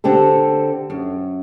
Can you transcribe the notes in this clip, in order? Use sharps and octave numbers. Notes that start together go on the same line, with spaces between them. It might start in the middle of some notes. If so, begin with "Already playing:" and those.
D3 C4 G4 A4
F#2